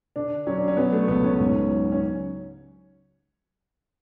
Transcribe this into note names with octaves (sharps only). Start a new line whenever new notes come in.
D3 D4
F#3 C#4
D4
C#4
F#3 B3
A3
C#2 B3
C#4
G#2
F#3
C#4